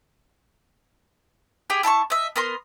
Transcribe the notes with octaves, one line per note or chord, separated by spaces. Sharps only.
G4 G#4 G5
E4 A5 B5 C#6
D#5 E5
B3 A#4 C6